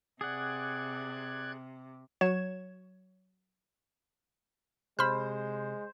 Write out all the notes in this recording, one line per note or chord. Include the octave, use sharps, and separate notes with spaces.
C3 G#4 D5 F#5 F#6 G#6
F#3 C#5 G#6 E7
C3 G#3 C5 B5 F6